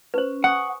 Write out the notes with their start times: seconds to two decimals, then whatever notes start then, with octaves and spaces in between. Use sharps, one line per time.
0.14 C#4 B4 C5
0.44 F#5 G#5 C#6 D#6